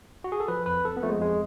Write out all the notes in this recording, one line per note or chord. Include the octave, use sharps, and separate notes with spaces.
F#4
G#4
A4
F3 B4
F2 B4
F2 A4
B3
F3 A3
G#3
F2 G#3